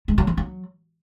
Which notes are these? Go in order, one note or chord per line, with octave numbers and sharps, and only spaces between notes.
G#3
F#3
F3
F#3